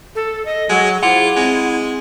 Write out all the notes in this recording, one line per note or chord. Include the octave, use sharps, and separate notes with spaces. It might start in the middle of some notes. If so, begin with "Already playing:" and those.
A4
D#5
F#3 G#3 F#5
E4 F4 G#4 C5 F#5 D6
G#3 C4